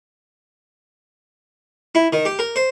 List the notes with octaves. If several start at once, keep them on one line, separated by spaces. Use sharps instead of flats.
E4
D#3
G4
A#4
C5